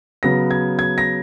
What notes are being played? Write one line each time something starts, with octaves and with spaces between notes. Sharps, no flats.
C#3 F#3 B3 A#6
G#6
G#6
A#6